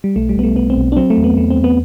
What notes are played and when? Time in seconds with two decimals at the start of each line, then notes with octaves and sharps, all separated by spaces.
0.04 G3
0.16 B1 A3
0.29 G3
0.36 B1 B3
0.44 A3
0.56 B1 B3
0.70 C4
0.77 B1
0.92 D4
0.97 F#3 C4
1.10 A3
1.17 E2
1.24 B3
1.37 E2 A3
1.51 C4
1.57 E2
1.64 B3